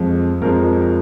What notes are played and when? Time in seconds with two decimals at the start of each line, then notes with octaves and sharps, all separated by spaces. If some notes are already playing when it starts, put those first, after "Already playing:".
Already playing: F2 F3 G#3
0.42 F2 F3 G#3 A#4